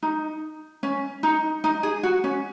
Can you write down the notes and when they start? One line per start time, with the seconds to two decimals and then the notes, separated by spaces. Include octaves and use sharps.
0.03 D#4
0.83 C#4
1.23 D#4
1.64 D#4
1.83 G#4
2.03 F#4
2.24 C#4